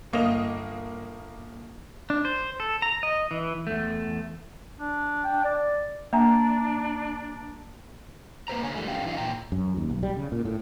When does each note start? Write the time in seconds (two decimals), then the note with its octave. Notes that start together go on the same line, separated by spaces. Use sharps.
0.13 G1 A#3 D#5 D#6 F7
2.10 D4
2.25 C5
2.60 A4
2.82 A#5
3.03 D#5
3.31 E3
3.67 E2 A3
4.79 D4
5.24 G5
5.44 D5
6.13 A#3 D4 E5 G#5 A#5
8.48 A#3 B4 C5 A#5
8.63 D3 C#5 G#5
8.75 E3 G3 A3
8.87 D3 B3 C#4 G4 F5 G5
9.05 E3 D#4 F4 F5
9.17 A#2 G5 A#5
9.52 F#2
9.77 D#2
9.90 B1
10.03 G3
10.17 C#3
10.32 A#2
10.45 A2